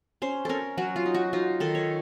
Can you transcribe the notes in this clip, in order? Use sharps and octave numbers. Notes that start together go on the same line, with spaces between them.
C#4 C5
C#4 A4 A#4
F#3 F#4
F4
D#4
F#4
D#4 F4
D#3 A4
C#5